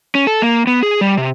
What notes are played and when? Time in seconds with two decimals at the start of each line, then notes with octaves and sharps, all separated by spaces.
0.15 C#4
0.27 A4
0.42 A#3
0.67 B3
0.83 G#4
1.01 G3
1.17 C3